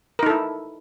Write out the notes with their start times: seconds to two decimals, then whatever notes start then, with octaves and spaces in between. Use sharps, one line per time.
0.19 A#4
0.23 D#4
0.26 A4
0.30 E4